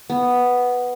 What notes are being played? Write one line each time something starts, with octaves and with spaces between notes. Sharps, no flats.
B3